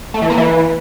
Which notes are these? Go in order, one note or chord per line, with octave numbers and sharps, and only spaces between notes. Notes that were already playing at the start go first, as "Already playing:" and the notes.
A3
E3
A#3
E3